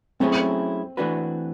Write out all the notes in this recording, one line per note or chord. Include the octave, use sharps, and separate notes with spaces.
F#3 A3 C4 C#4 E4 G#4
E3 A3 D4 F#4 B4